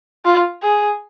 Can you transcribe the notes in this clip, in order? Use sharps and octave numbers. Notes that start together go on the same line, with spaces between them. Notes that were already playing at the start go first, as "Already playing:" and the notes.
F4
G#4